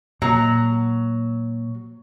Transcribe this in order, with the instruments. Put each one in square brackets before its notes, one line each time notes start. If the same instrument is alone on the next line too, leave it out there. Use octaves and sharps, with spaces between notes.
[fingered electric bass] A#2 [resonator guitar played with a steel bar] F#3